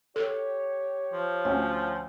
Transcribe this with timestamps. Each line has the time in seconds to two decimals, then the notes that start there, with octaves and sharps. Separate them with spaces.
0.16 G4 A4 C#5
1.13 F3
1.45 D2 C#4